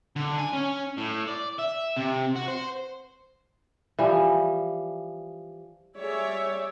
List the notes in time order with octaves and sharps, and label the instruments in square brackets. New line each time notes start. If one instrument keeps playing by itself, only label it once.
[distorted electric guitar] D3
G#5
C#4
A2
D5
E5
C3
F#4
C5
[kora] E3 F3 G3
[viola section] G3 G#4 C#5 D5 E5